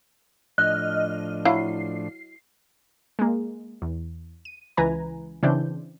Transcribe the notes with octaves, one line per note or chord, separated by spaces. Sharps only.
A2 F3 D4 D#5 F6 F#6
F#3 E4 F5 C7
G#3 A#3
E2
D#7
C#2 E3 B4 G#5 A#5
C#3 E3 C4 D4 G6